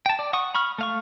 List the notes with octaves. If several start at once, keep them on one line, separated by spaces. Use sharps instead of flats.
G5 A5
D5
F#5 C#6 D#6
B5 C#6 F6
A3 F5 C#6